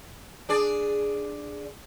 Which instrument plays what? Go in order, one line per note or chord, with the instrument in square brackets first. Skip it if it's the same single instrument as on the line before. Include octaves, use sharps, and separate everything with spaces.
[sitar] D4 G#4 D5